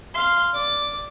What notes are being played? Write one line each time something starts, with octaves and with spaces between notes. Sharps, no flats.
F5 C6
D5 D6